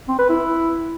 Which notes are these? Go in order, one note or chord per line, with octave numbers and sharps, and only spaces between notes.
C4
B4
E4